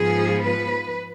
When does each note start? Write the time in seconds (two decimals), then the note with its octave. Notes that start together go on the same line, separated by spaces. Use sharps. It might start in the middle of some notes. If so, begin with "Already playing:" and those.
Already playing: G#2 F3 B3 G#4
0.45 B4